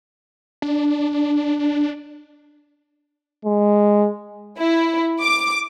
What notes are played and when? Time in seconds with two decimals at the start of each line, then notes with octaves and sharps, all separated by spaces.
0.62 D4
3.45 G#3
4.56 E4
5.21 D6